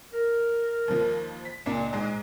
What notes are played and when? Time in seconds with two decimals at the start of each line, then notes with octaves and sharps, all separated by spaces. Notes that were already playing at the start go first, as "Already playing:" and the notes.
0.13 A#4
0.88 D#2 F3
1.45 B6
1.66 C#2 A#2 A#3 D4
1.93 G#2 G#3